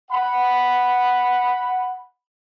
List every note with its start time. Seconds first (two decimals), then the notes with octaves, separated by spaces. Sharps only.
0.11 F#5 B5